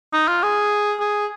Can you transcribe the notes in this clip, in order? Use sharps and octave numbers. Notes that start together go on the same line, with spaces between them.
D#4
F4
G#4
G#4